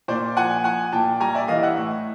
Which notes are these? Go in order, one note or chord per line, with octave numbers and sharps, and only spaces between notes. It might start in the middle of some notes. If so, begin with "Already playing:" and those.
A#2 C5 D5
F3 F#5 G#5
F3 F#5 G#5
A#2 G5 A5
G3 G#5 A#5
D5 E5
E3 D#5 F5
E5 F#5
A2